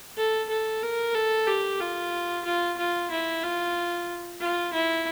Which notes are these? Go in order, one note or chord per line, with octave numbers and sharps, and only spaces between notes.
A4
A4
A#4
A4
G4
F4
F4
F4
E4
F4
F4
E4